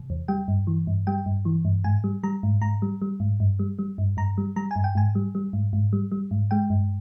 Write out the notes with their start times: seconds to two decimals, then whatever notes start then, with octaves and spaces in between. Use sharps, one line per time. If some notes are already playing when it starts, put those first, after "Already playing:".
Already playing: C3
0.10 E2
0.28 G3 G5
0.48 G2
0.67 E3
0.87 G2
1.07 G3 G5
1.26 G2
1.45 E3
1.65 G2
1.84 G#2 G#5
2.04 G3
2.23 G3 A#5
2.43 G#2
2.61 G#2 A#5
2.82 G3
3.02 G3
3.20 G#2
3.40 G2
3.59 G3
3.79 G3
3.98 G2
4.17 G2 A#5
4.38 G3
4.56 G3 A#5
4.71 G2 G#5
4.84 G5
4.95 G#2 G#5
5.15 G3
5.35 G3
5.53 G#2
5.73 G#2
5.93 G3
6.12 G3
6.31 G#2
6.51 G#3 G5
6.70 G2